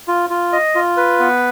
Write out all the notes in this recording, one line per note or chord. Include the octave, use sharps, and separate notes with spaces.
F4
F4
D#5
F4
B4
B3